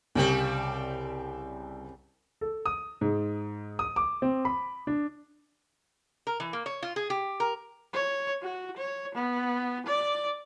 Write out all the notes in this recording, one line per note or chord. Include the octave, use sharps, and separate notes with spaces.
C2 C#3 G3 C4
A4
D#6
G#2
D#6
D6
C4
B5
D4
A#4
E3
A#3
C#5
F4
G#4
G4
A#4
C#5
F#4
C#5
B3
D5